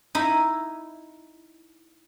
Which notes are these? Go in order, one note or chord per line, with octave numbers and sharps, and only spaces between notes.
D#4 E4